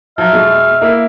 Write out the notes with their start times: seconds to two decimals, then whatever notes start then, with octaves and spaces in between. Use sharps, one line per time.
0.18 F3 F#3 E5 F6
0.33 B2 G#3
0.81 A#3 E4